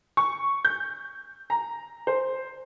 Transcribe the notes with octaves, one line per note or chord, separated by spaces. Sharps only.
C#6
G6
A#5
C5